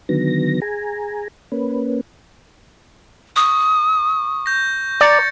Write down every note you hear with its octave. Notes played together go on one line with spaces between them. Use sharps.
D3 D#3 F#3 B3 A#6
G#4 G#5 A#5
A#3 C#4 B4
C#6 D#6
G6 A#6
D5 A#5 A6 C#7